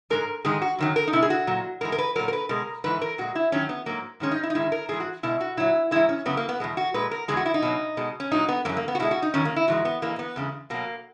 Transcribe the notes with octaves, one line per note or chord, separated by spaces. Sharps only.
G#2 D#3 G#3 A#4
G#2 D#3 G#3 G#4
F#4
F#2 D#3 F#3
A#4
D#4
B2 G#3 E4
G#4
F#4
A#2 F#3
G#2 E3 G#3 A#4
A#4
B4
A#2 F#3 A#4
A#4
B4
B2 G#3 A#4
G#2 E3 B4
A#4
A#2 G#3 F#4
E4
F#2 D#3 F#3 C#4
B3
G#2 F#3 A#3
G#2 D#3 G#3 C#4
D#4
E4
D#4
G#2 D#3 G#3 E4
A#4
G#2 E3 G#3 G#4
F#4
B2 G#3 E4
F#4
A#2 F#3 E4
G#2 E3 G#3 E4
C#4
F#2 C#3 F#3 B3
A#3
B3
E2 B2 G#3
F#4
A#2 G#3 B4
A#4
E2 C#3 E3 G#3 G#4
F#4
E4
D#4
B2 F#3
B2 G#3
C#4
A#2 F#3 D#4
B3
F#2 E3 G#3 A#3
A#3
B3
F#4
B2 G#3 E4
F#4
D#4
E2 D#3 F#3 C#4
A#3
E4
G#2 E3 G#3 F#4
B3
G#2 E3 G#3 A#3
B3
E2 C#3 G#3
B2 F#3 A#3